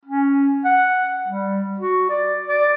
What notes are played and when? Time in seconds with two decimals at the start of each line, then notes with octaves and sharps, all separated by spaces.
0.05 C#4
0.65 F#5
1.28 G3
1.80 F#4
2.09 D5
2.47 D5